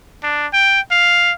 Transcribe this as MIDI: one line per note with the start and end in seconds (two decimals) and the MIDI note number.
0.23 0.47 62
0.53 0.80 79
0.91 1.32 77